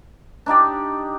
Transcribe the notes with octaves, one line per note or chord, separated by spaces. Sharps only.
D4 D#4 G4 D5